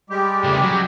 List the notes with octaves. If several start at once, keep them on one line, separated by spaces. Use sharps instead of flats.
G3 G#3 G4
C#3 A3
F#3